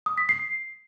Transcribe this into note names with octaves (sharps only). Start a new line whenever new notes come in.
D#6
B6
C7